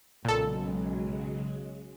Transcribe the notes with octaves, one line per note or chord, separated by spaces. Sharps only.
B1 A#2 C#3 F#3 G#3 A4